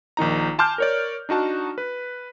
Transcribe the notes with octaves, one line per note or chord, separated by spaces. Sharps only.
A#1 D#3 D#4 A#5
G#5 A5 C6 D6 F6 G6
A#4 C#5 D5
D4 D#4 F#4 A5
B4